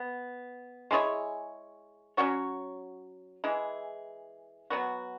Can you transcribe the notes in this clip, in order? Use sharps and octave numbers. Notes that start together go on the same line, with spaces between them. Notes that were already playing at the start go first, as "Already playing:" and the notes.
Already playing: B3
G#3 E4 G#4 C#5
F#3 C#4 F#4 C#5
E3 G#3 E4 G#4
F#3 B3 F#4